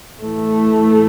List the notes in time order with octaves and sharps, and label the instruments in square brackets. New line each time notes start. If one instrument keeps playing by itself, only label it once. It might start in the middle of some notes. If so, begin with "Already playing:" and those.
[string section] A2 E3 A3